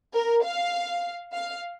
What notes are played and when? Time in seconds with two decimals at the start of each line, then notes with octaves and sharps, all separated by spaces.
0.14 A#4
0.44 F5
1.33 F5